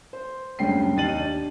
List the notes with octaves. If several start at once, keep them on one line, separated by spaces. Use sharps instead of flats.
C5
F#1 D2 G2 C#4 G5 C7
D#2 D#4 A6 D#7 F#7
D4